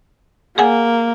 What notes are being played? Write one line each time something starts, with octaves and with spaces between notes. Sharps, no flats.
A#3 G#4 F#5 G#5